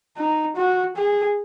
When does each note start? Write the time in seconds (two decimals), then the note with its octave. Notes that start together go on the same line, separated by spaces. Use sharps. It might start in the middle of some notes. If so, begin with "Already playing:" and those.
0.17 D#4
0.56 F#4
0.96 G#4